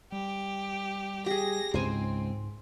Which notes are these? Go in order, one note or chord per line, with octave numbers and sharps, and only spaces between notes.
G3 G4
G4 G#4 A#6
C#2 G#2 C4 C5 G#5